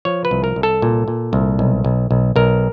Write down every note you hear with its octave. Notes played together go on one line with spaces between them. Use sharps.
F3 C#5
B4
C2
A#4
C2
A4
A#2
A#2
C2
B1
B1
B1
B1 A#4